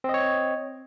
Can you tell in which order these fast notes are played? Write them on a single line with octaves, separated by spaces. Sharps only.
C4 D#5 C#5